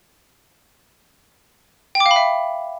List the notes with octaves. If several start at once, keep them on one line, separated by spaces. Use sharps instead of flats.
G5
D6
F5
B5
E5